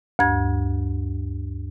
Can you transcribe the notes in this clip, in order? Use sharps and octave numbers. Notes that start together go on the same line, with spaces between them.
D2 G2 G#6